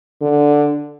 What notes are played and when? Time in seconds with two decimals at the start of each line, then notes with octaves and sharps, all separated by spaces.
0.22 D3